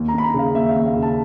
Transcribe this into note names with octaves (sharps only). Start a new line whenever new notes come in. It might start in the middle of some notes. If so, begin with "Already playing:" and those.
Already playing: D#2
A#5
D#2 B5
A#5
C#3 F5
D#2 E5
F5
D#2
F5
C#3
A5